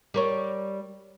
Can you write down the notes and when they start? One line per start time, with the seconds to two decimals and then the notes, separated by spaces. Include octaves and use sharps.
0.14 G3 A#4 C#5